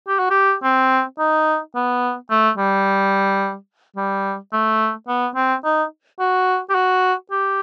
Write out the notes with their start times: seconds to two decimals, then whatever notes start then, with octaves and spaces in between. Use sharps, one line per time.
0.08 G4
0.19 F#4
0.30 G4
0.63 C4
1.19 D#4
1.75 B3
2.31 A3
2.58 G3
3.97 G3
4.53 A3
5.08 B3
5.35 C4
5.64 D#4
6.20 F#4
6.70 G4
6.75 F#4
7.31 G4